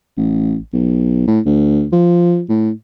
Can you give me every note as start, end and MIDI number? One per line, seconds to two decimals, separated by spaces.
0.17 0.57 33
0.73 1.24 35
1.28 1.40 45
1.46 1.87 38
1.93 2.43 53
2.49 2.71 45